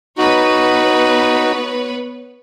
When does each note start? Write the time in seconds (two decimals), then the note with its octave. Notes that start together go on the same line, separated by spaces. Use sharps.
0.18 B3 D#4 F#4 B4 C#5